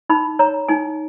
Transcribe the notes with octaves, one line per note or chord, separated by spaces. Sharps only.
D#4 B5
C#5 A#5
D#4 G#5